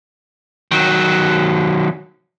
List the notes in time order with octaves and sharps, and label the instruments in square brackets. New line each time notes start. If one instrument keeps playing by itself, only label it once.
[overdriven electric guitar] D#3 F#3